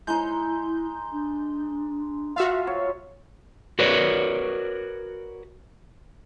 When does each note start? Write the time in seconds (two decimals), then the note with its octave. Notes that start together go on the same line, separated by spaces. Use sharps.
0.07 G#3 D#4 E4 G6
1.12 D4
2.36 F4 F#4 E5 F5
2.67 C#5
3.79 F#4 A#4 B4 C#5 D5